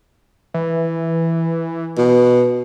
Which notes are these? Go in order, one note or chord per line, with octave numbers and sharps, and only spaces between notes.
E3
B2